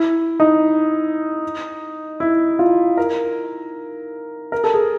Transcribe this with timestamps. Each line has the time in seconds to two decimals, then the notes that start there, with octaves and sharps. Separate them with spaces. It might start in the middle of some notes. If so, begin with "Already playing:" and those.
Already playing: E4
0.40 D#4
2.20 E4
2.59 F4
2.97 A#4
4.52 A#4
4.64 A4
4.74 G#4